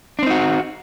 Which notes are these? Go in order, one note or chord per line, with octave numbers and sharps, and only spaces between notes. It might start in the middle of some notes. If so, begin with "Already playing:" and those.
C4 D4 D#4 F#4